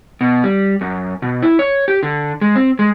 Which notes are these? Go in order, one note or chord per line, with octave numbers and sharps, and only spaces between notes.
B2
G3
F#2
B2
E4
C#5
G4
D3
G#3
C4
G#3